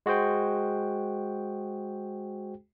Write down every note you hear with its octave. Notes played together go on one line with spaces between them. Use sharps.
G#3 F#4 G#4 C5 G5